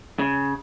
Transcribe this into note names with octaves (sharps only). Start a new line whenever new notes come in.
C#3